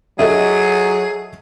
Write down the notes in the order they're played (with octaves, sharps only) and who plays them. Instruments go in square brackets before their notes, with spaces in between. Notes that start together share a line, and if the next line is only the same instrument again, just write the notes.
[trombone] F#3 [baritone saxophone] G#4 [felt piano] A4 D#5 E5